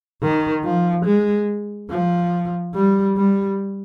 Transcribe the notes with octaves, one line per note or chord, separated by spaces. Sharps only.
D#3
F3
G#3
F3
G3
G3